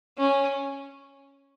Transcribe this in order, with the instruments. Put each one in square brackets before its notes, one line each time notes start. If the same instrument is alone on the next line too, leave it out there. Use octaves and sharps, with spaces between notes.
[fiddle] C#4